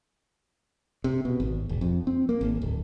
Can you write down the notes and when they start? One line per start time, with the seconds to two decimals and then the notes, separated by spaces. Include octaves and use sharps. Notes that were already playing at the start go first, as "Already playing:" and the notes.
1.04 C3
1.25 B2
1.40 G#1
1.69 E1
1.81 F2
2.07 C4
2.29 A#3
2.41 G#1
2.62 D1